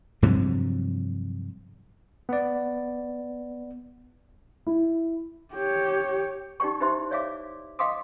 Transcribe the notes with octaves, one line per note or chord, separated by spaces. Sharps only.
G2 C3 F3 F#3
B3 D5
E4
G4 C#5
D#4 G4 D5 G5 C#6
D#4 E4 G4 C5 E5 C6
C#5 D5 E5 F5 D6
D#5 F5 G5 C6 D6 D#6